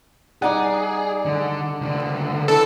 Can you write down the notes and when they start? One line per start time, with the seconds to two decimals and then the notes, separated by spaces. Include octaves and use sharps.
0.42 G3 D#4 G#4 D5 F#5
1.26 D3
1.81 C#2 D3
2.48 E3 A4